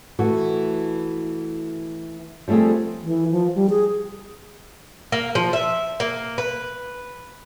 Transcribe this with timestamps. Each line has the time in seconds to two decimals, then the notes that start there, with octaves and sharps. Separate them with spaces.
0.19 E3 A3 F#4
2.48 F3 G3 A3 C4 G#4
3.03 E3
3.31 F3
3.55 G3
3.70 G#4
5.12 A#3
5.35 F3
5.53 E5
6.00 A#3
6.38 B4